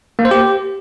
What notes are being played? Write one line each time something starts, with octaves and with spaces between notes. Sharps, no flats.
A#3
C5
G4